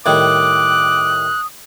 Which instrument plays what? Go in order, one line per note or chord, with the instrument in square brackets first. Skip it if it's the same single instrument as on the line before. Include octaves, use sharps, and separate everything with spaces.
[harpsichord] A2 D#3 G3 [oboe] D6 [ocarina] D#6 [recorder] F#6